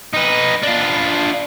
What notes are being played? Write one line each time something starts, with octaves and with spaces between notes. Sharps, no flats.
D#4 B4
D4 F4